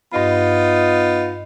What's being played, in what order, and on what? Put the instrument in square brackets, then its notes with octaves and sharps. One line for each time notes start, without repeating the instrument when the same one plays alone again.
[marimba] G2 B5 [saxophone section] B3 D#4 F4